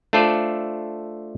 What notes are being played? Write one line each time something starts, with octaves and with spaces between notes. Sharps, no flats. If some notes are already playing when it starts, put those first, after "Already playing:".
A3 D4 F4 A4 C5 D5